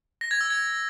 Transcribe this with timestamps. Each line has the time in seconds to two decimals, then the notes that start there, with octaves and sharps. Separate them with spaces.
0.21 A#6
0.31 G#6
0.41 E6
0.50 G#6